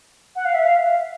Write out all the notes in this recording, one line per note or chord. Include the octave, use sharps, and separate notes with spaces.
F#5
F5
E5
F5